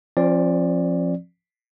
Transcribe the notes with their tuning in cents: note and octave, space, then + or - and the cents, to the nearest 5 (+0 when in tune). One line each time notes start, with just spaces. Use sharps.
F3 +0 C4 +45 D5 +0